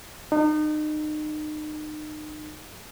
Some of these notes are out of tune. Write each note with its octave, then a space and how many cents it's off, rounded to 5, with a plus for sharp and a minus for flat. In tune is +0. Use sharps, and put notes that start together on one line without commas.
D#4 -35